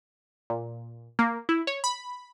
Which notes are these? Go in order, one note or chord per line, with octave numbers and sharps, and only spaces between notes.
A#2
A#3
E4
C#5
B5